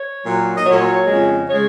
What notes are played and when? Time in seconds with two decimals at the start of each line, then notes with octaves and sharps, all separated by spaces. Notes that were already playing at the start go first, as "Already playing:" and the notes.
Already playing: C#5
0.25 A#2 F#3
0.57 D#5
0.66 A#2 F#3 C#5
1.07 F2 C#3 G#3
1.48 C#3 G#3 C#5